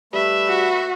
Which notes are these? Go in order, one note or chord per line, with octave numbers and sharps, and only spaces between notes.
G3 A3 B4 E5 B5
F#4